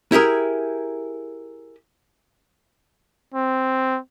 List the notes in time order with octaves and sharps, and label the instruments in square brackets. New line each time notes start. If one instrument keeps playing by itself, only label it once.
[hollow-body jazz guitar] E4 G4 G#4 A#4
[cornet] C4